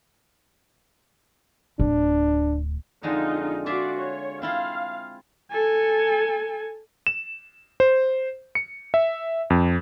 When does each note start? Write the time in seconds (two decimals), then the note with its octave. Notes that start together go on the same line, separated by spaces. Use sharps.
1.80 D1 D4
3.03 F2 D3 G#3 D#4 F4 D#5
3.66 F4 F#4 G#4 D5 E5
3.98 C#5
4.42 C4 E4 F4 F5
5.51 A4 G#5
7.07 E7
7.80 C5
8.55 C#7
8.94 E5
9.50 F2